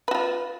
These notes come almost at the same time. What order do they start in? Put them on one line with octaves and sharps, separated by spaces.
B4 F#4 F4